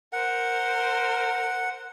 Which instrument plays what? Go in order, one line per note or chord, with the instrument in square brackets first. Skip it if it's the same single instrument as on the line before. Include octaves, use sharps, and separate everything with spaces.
[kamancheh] A#4 C5 [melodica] F#5